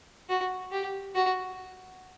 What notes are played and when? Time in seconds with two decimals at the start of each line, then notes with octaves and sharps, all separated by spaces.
0.29 F#4
0.72 G4
1.15 F#4